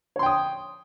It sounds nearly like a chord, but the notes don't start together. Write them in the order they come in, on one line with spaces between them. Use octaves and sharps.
C#5 C6 G5 D#6